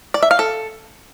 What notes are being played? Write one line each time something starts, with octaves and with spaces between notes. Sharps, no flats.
D5
E5
F5
A4